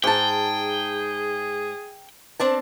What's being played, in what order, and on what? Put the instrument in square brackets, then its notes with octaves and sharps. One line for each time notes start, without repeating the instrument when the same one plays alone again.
[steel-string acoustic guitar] G#2 A5 [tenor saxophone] G#4 [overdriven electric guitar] G5
[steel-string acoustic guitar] C4 D4 A5